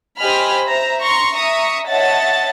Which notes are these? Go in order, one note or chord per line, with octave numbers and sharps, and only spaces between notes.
G4 C5 D#5 G#5 B5 F6
C5 E5 A#5
A#5 C6 C#6
E5 A#5 C#6 D#6
C#5 D#5 E5 F#5 A5 A6